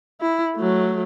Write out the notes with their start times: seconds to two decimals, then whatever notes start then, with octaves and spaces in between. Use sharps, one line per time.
0.21 E4
0.56 F#3 A3